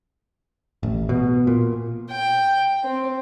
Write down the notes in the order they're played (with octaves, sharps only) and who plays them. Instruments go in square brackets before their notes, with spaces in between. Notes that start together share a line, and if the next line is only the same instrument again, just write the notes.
[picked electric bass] A1
B2
A#2
[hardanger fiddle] G5
C4